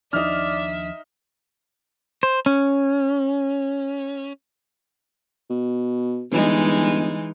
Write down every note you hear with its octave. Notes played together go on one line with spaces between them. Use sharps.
D#2 F3 D4 D#4 D5 E5 F6
C5
C#4
B2
G1 E3 G#3 D#4